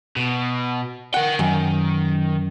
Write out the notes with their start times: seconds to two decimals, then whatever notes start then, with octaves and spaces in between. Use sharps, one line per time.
0.17 B2
1.14 A#4 F#5 G5
1.39 F#2 D#3